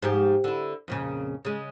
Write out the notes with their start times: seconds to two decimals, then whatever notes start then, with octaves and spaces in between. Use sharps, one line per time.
0.02 G#2 F3 G4
0.44 D3 E4
0.88 F2 A#2 C#3
1.45 C#3 G#3